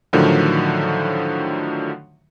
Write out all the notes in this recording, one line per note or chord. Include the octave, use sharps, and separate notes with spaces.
A2 D3 D#3 F3 F#3